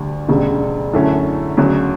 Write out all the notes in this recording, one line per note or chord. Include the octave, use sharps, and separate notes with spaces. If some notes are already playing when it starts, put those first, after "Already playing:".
Already playing: D2 D3 G3
E1 D2 C#3 G3
F#2 D3 A3 C#4 E4
D2 C#3 F#3